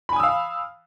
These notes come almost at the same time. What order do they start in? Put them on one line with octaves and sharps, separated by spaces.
B5 G#5 D#6 E6 F5